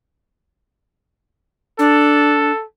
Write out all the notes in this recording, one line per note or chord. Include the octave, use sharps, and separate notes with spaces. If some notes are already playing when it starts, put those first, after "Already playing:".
D4 A4